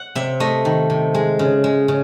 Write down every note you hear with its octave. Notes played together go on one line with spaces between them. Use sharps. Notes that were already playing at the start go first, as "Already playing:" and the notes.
Already playing: F#5
C3 E5
A3 D#5
D#3
C3
G#3
C#3
G#3
C#3